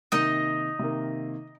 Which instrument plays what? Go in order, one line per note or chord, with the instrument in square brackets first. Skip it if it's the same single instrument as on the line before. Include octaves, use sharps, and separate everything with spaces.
[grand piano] C3 D#3 A#3 [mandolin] D#4 D#5
[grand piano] C3 D#3 A#3